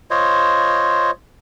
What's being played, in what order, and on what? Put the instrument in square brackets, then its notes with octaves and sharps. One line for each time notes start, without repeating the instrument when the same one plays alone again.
[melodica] F4 C5 C#5 D#5